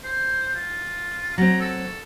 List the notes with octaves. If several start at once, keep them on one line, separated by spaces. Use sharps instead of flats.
C5
F4
F#3 C4 A#5
A4